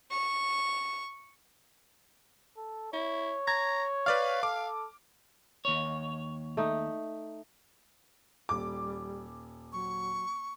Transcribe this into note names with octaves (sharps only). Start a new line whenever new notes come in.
C#6
A4
E4 C#5
A#5 G#6
B4 D5 F5 F6
A4 D6
D#2 C#5
A3 D#4
D#1 G3 D6
F#3 C#6